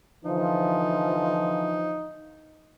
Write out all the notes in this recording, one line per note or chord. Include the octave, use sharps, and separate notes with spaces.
D3 E3 F3 D#4